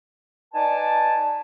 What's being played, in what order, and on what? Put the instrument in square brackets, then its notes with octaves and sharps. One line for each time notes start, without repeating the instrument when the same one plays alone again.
[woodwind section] D#4 B4 D5 G#5 A5